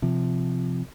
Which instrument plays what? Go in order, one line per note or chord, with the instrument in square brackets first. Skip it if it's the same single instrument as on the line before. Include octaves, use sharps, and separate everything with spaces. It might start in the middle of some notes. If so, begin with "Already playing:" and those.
[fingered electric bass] C3 F3